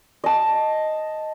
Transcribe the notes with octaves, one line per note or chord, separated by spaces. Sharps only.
D#5 A5